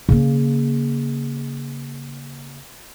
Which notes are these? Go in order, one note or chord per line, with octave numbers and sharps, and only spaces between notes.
C#3 A#3